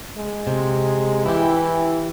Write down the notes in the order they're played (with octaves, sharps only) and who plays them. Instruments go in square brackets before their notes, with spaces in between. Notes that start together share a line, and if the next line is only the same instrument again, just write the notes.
[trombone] G#3
[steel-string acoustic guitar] C3
[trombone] E3 [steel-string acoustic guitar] E4 G4